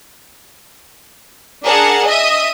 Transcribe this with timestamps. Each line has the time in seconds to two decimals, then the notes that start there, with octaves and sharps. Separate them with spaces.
1.64 D4 G#4 A#4 F#5 A5
2.07 D#5 E5 D#6